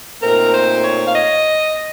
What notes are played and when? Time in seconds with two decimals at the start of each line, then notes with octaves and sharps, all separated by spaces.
0.21 A#2 A3 C4 D#4 A#4
0.52 C5
0.83 C#5
1.05 F5
1.14 D#5